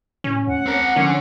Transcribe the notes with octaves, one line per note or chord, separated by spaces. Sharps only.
A2 C#4
D2 F#5
C4 A#4
D3 F3 C#4